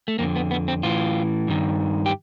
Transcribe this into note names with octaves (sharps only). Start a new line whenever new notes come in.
A3
F2 D3 A#3
B3
B3
C4
A2 E3 F4
G2 D#3
G4